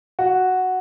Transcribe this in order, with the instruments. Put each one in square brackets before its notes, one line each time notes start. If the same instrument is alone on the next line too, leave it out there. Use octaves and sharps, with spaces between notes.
[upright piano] F#4